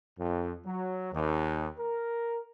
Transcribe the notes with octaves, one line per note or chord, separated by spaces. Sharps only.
F2
F#3
D#2
A#4